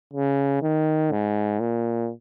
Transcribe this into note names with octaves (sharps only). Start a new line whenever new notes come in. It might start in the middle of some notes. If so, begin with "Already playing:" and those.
C#3
D#3
G#2
A#2